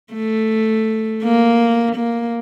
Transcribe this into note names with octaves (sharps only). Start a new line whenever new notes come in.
A3
A#3
A#3